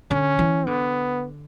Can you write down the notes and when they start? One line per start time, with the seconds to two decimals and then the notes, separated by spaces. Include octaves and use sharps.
0.11 D3 C#4
0.39 E3
0.66 D3 B3